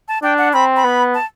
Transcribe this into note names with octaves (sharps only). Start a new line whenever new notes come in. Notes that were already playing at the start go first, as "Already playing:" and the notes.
A5
D4 G5
F#5
C4 B5
B5
B3
A5